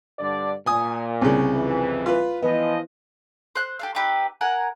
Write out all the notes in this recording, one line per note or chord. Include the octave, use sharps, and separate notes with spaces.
G2 D3 D5
A#2 G#5 D#6
C2 C#3
F2 E3
F4 B4
E3 F3 B3 D#5
C5 F#6
G4 A4 F5
C4 D#4 G4 B4
A#4 F#5 G#5